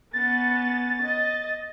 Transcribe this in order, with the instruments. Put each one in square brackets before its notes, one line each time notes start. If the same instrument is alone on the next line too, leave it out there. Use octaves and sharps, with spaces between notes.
[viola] B3 C#4 [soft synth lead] A6
[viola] D#5